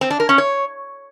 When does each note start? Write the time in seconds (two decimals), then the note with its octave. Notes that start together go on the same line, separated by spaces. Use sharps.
0.01 C4
0.10 D4
0.20 A#4
0.29 C#4
0.38 C#5